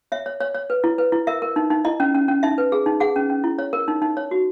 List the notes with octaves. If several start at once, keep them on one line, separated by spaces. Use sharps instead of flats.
C#5 E5
C#5
C#5
C#5
B4
E4
B4
E4
A#4 E5
A#4
D#4
D#4
E4 D#5
C#4
C#4
C#4
D#4 E5
B4
G#4
D#4
G#4 F#5
C#4
C#4
E4
C#5
A#4
D#4
D#4
C#5
F#4